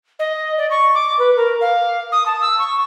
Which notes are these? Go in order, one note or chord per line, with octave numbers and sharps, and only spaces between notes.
D#5
D5
C#6
D6
B4
A#4
F5
D#6
A5
E6
C#6